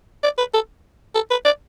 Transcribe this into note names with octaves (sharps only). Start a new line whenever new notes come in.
D5
B4
A4
A4
B4
D5